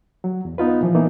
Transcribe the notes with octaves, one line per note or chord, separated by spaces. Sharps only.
F#3
E2
B3 D#4 F4 B4
A#2 E3 F3
E3 A#3 B3 D#4